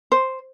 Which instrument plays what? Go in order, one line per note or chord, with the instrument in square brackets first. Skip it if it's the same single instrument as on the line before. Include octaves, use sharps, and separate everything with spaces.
[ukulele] C5